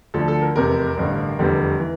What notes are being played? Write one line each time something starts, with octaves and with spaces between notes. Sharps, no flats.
D2 D3 F3 A4
A4
A#4
F1 E2 C3 A#4
A1 G2 D3
F1 E2 D3 G3
E3